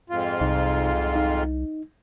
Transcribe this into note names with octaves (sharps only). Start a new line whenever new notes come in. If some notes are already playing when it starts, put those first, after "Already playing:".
F2 G#2 F4
C2 C3 D#4 F5
D#4